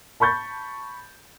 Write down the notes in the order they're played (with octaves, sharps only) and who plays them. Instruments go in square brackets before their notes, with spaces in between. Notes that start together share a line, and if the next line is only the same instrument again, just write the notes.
[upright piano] A5 B5 C#6 G6 A6